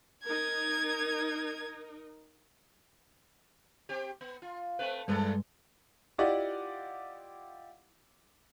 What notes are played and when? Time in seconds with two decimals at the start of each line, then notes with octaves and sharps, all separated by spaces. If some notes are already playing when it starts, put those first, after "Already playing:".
0.24 D#4 A#4 G#6
3.89 C4 G4
4.21 B3
4.42 F4
4.79 A3 C4 B4
5.08 E2 G2 G#3 A#3 A4
6.18 E4 F4 G4 D5 D#5 F#5